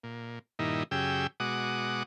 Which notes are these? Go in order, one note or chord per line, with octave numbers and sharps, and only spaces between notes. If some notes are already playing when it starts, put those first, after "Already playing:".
A#2
G2 A#2 D#3 D#4 E4
F#2 C#3 G4 G#4 G5 E6
B2 G#3 F#4 F#5 D6 D#6